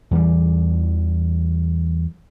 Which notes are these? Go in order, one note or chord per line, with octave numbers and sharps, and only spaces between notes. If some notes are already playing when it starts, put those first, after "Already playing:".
E2 E3 G3